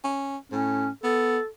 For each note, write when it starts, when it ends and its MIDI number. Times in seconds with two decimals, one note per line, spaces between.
0.04 0.37 61
0.52 0.88 45
0.52 0.89 61
1.04 1.38 59
1.04 1.47 69